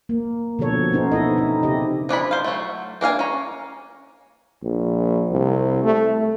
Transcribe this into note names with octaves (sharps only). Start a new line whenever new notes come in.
A#3
B2 D3 F3 A4 C#5
B3 C#4 D#4 C5
D#4 E4 A4 D#5
C4 D#4
C#3 G4 D#5
F3 D4 E4 B5
C5 F5
F#3 A3
A#3 D4 F5 G#5
C#4 A#5
A#1
C2
A3